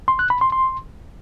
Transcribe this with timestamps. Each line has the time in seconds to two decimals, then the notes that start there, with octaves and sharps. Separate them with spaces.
0.08 C6
0.19 F#6
0.30 B5
0.41 C6
0.52 C6